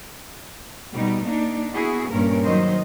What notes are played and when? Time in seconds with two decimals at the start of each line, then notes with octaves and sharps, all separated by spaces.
0.92 B2 G3 D#4
1.25 A#3 D4 D#4
1.73 B3 E4 F#4 G#4
2.11 G2 A#2 C#4 A#4
2.45 D#3 F#3 C5 D#5